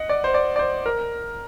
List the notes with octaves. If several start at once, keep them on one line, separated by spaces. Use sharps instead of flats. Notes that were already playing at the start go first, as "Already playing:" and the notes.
Already playing: D#5 F#5
D5
C5
D5
D5
C5
A#4